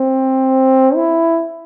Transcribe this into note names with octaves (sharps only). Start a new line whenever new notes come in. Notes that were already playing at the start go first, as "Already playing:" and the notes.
Already playing: C4
E4